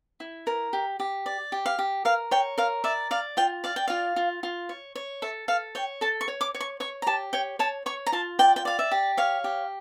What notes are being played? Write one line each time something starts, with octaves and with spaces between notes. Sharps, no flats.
E4
A#4
G4
G4
D5
G4
F5
G4
A#4 F5
C#5 G5
A#4 F5
D5 E5
D5 F5
F4 G5
D5 F5
G5
F4 F5
F4
F4
C#5
C#5
A4 E5
A4 F5
C#5 G5
A4 A5
C#6
C#5
D6
C#5
C#6
C#5 C#6
A#5
G4 A5
C#5 G5
C#5 A5
C#5 C#6
A#5
F4 A5
D5 G5
G5
D5 F5
E5
G4
C#5 F5
G4